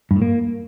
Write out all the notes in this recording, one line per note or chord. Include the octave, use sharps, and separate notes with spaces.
G2
A2
A#3